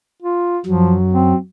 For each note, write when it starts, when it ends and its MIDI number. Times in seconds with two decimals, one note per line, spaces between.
0.23 0.58 65
0.66 1.33 42
0.66 0.96 53
0.66 1.33 54
1.13 1.36 60